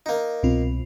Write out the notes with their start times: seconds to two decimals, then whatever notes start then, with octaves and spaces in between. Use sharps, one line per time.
0.06 A#3 D#4
0.43 C2 B2 C4 F4